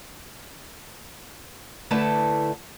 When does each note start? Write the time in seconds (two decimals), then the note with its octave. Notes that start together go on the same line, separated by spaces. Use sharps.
1.91 D3 A3 E4 A4 B4 A5